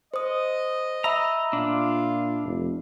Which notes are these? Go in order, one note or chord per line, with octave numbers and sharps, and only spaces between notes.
C5 D#5 D#6
E5 A#5 B5 E6
A#2 D4 F4
F1